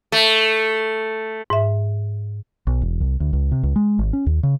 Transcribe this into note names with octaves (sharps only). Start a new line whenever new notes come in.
A3
G#2 E5
B1
E1
C2
D2
C#2
C3
C#2
G#3
G#1
C#4
D#2
C#3